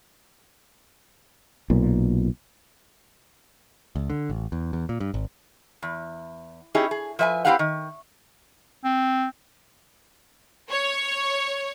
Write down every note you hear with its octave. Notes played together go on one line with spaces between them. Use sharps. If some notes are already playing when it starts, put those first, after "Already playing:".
B1 A#2
C#2
D3
A1
E2
E2
A#2
G2
G#1
E2
C#4 D#4 E4 G4 G#4
G#4
F3 B4 E5 G5 G#5
C4 E4 G4 B4 F5 F#5
D#3
C4
C#5